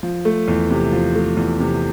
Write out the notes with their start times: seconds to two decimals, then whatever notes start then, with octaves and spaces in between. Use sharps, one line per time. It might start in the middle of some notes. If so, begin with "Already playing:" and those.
0.03 F3
0.25 A3
0.48 E2
0.71 C3
0.92 F3
1.15 A3
1.37 E2
1.60 C3